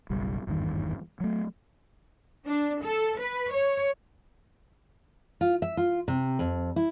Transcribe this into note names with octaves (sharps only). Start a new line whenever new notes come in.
F#1 B1 G3
G#1 E2 G2 D#3
F#3 A3
D4
A4
B4
C#5
F4
E5
F4
C3
F2
E4